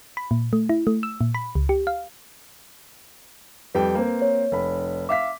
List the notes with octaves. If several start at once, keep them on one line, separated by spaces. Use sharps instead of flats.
B5
A#2
A3
E4
A3
E6
A#2
B5
C#2
G4
F5
F2 G3 B4 G5
A#3 C4
C#5
F1 B5
E5 F5 D6 B6